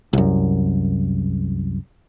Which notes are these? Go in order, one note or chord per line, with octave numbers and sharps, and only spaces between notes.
C2 F#2